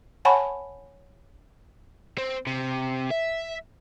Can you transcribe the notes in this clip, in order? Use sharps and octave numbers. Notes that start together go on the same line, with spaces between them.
C#5 F#5 G#5 A5 B5 C#6
C4
C3
E5